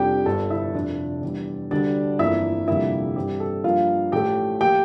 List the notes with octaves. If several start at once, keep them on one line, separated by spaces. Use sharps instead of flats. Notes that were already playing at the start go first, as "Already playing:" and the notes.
Already playing: F1 F2 C3 G3 D4 G4 G5
G1 G2 D3 A4 A5
E4 E5
F1 F2 C3 D4 D5
E2 E3 G3 D4
D2 D3 G3 D4 D5
G1 F2 E3 A#3 E4 E5
F1 F2 D3 G3 A#3 E4 E5
G2 E3 G3 C4 G4
A4
G2 F3 A#3 F4 F5
A1 A2 F3 A3 G4 G5
F3 A#3 F4 G4 G5